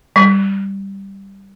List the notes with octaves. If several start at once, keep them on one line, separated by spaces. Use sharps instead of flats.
G3